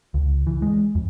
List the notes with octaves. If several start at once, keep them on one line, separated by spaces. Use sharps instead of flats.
C#2
E3
G#3
F2